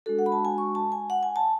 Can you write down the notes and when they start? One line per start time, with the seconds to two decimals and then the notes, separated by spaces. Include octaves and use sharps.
0.06 G#3 D4 F#4 A4
0.19 F#5
0.26 B5
0.32 A5
0.45 G#5
0.58 C#6
0.75 A5
0.92 G#5
1.10 F#5
1.23 G#5
1.36 A5